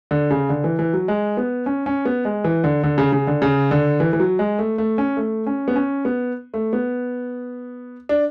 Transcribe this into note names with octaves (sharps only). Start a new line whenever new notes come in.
D3
C#3
D3
E3
E3
F#3
G#3
B3
C#4
C#4
B3
G#3
E3
D3
D3
C#3
C#3
D3
C#3
D3
E3
E3
F#3
G#3
A3
A3
C#4
A3
C#4
B3
C#4
B3
A3
B3
D4